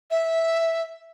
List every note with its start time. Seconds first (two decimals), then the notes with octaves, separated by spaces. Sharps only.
0.11 E5